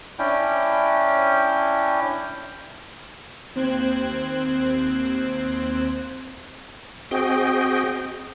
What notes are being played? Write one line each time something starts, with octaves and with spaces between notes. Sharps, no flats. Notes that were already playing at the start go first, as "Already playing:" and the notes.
C#4 D4 E4 G5
D#2 C4 C5 F#6 G#6
C4 F#4 G#4 D#5 G5